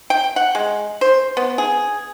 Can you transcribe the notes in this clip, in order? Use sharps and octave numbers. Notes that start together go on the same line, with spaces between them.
G5
F#5
G#3
C5
B3
G#4